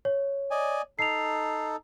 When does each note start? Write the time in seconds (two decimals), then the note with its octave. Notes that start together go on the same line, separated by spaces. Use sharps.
0.05 C#5
0.51 D5 D#5 G#5
0.99 D#4 A4 C7 F7